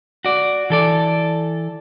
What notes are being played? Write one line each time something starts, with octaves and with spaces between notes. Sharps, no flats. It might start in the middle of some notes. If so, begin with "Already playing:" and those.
F#4 D5
E3 A4 D5